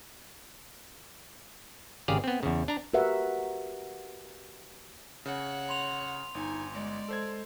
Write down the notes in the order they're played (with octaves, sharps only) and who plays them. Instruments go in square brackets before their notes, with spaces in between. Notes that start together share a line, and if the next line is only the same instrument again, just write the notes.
[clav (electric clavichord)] G#1 C#3 G4 G#4 D5 F5
B3 C4
E2 C#3
D4 A#5
[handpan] F#4 G4 A#4 B4 E5 F#5
[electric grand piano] C#3 [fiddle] C#5 F#5
[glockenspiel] B5 C6 F7
[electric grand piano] G1 [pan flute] D#4 [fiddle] G#5
[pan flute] G#3 [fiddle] D5
[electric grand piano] A4 C5 G#6